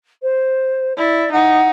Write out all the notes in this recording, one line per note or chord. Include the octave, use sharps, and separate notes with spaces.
C5
E4 D5
D#4 F#5